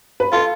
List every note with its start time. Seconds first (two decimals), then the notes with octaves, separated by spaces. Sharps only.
0.20 B4
0.32 F4 A4